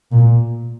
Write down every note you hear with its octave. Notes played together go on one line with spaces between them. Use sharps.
A#2